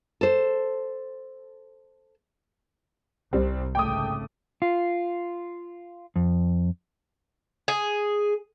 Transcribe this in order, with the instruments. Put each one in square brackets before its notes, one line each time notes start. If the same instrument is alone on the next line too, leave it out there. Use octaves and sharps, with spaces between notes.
[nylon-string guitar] A4 C5
[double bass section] C2 [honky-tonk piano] G3 C4
[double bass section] G#1 C#3 A3 [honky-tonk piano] G5 D6 D#6
[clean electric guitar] F4
F2
[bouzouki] G#4